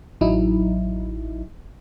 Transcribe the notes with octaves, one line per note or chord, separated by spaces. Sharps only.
A1 F#3 D#4 E4